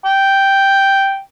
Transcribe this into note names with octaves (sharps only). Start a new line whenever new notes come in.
G5